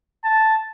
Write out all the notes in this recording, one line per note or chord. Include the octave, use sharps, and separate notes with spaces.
A5